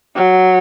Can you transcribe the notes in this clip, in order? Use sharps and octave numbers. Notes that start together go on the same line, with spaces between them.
F#3